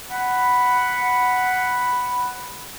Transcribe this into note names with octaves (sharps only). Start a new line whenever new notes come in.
F#5 B5